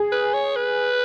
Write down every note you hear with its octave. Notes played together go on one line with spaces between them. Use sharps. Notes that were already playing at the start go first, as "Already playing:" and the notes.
Already playing: G#4
B4
C#5
B4